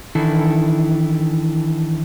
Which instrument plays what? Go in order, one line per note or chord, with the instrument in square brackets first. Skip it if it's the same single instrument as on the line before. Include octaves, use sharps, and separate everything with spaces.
[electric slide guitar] D#3 E3 D4 E4 A4